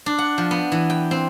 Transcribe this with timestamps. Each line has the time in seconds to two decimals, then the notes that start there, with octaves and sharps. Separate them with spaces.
0.06 D4
0.18 F#5
0.38 F3
0.51 B3
0.72 E3
0.90 G5
1.11 C4